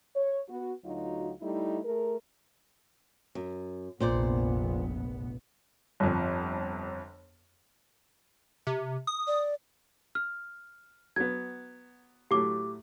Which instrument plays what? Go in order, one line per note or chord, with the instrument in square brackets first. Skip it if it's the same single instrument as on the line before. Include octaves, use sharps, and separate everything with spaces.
[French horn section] C#5
B3 F#4
D2 F#3 D#4 F4 F#4
G3 A3 D#4 E4
A3 G#4 A#4
[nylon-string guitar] F#2
[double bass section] F1 A#1 B3 [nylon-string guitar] A#2 C5 D5
[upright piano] G1 F2
[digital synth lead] C3
D#6
[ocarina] D5
[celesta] F6
[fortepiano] F#3 B3 [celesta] G#6
[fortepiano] A2 F#3 A3 [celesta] G4 D6